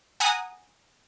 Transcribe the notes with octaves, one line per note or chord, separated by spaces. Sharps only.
F#5 G#5 A#5 D#6